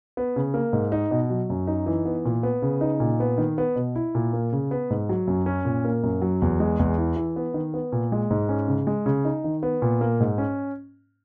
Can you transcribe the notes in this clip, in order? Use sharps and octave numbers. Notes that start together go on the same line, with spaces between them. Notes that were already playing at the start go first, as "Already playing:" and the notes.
B3
C#3
A#3
G#2
D#4
B2
F#3
F#2
D#4
E3
B3
A#2
B3
C#3
D#4
A#2
B3
D#3
B3
B2
E4
A#2
A#3
C#3
B3
G#2
F#3
F#2
C#4
A#2
A#3
F#2
F#3
E2
G#3
E2
E4
E3
B3
D#3
B3
A#2
G#3
G#2
C#4
C#3
G#3
C#3
D#4
D#3
B3
A#2
A#3
G#2
C#4